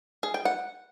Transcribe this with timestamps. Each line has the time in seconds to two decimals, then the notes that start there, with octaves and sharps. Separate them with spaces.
0.23 G#4
0.34 G5
0.45 F#5